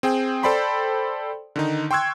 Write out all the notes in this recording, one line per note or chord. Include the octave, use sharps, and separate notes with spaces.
C4 G#4 G5
A4 C5 D5 G5 B5 C6
D3 D#3 D#4
G5 C6 C#6 E6 F#6 G#6